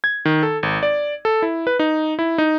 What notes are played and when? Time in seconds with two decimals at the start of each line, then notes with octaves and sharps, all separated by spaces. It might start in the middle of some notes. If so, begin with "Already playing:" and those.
0.04 G#6
0.25 D#3
0.43 A4
0.63 G#1
0.83 D5
1.25 A4
1.42 E4
1.67 B4
1.79 D#4
2.19 E4
2.38 D#4